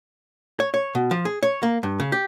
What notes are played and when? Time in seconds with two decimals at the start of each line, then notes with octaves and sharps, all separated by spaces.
0.60 C#5
0.74 C#5
0.95 B2
1.11 F3
1.25 G#4
1.43 C#5
1.63 A#3
1.83 G2
2.00 C#3
2.12 G4